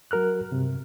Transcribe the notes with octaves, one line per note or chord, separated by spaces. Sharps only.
F#3 F#4 A#4 F6 F#6
G2 C3